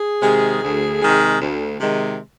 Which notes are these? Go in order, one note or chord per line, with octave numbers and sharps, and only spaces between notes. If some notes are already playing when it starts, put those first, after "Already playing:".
Already playing: G#4
C3 D#3 G#3
D2
C3 D#3 G#3
D2
C3 D#3 G#3